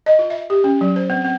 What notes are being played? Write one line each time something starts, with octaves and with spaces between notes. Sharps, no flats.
D#5
F4
E5
G4
C#4
F#3
C5
C4
C4